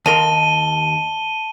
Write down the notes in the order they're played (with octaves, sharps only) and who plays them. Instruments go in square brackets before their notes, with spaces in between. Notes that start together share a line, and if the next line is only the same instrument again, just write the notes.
[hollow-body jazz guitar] D#2 A#4 C6 [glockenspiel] A5 [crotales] D#7 G7